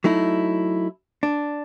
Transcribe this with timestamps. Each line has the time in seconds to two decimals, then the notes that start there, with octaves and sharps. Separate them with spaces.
0.04 F#3 A3 D#4 E4
1.23 D4